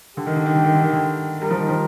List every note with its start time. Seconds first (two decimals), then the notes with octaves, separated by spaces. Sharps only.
0.17 D3 G4
0.26 D#3
0.36 D3
0.46 D#3
0.55 D3
0.64 D#3
0.75 D3
0.83 D#3
0.93 D3
1.42 G3 A#4
1.51 F3
1.60 D#3
1.69 F3